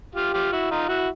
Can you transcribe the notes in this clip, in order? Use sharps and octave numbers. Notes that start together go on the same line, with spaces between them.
F4 G4
F4 G4
E4 F#4
D#4 F4
E4 F#4